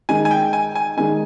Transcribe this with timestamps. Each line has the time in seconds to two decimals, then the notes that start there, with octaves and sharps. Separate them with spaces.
0.09 D#3 G#3 D#4 G#5
0.25 G#5
0.31 G5
0.53 G#5
0.75 G#5
0.97 D#3 G#3 D#4 G#5